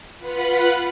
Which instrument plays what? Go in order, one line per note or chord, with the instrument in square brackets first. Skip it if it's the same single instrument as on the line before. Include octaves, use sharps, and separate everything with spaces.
[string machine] F4 B4 F#5 B5